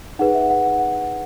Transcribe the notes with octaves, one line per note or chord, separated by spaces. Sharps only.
D#4 G#4 B4 F#5
E5
F#5
F#5
F#5